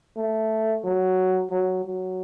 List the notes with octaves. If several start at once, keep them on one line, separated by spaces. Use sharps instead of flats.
A3
F#3
F#3
F#3